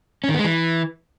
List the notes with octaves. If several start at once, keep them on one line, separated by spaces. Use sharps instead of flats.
C#4
D#3
B3
G#3
E3